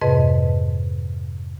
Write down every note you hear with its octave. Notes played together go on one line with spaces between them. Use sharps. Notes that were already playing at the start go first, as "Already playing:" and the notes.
F2 G#2 C3 B4 D#5